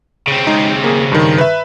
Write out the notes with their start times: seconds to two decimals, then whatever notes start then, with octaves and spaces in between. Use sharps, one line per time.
0.28 C#3 C4
0.47 G#3 D#4
0.84 A#3 G#4
1.12 G2 D#3
1.38 B4 E5